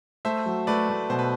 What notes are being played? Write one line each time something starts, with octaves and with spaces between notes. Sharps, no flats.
A3 C5 E5
F#3
A3 B4 D5
A3
B2 C5
B4